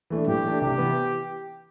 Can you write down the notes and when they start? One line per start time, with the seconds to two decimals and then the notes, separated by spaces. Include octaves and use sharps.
0.10 E3 A3 D4
0.27 A2 G4
0.44 E3 A3 D4
0.61 C3 G4
0.78 E3 B3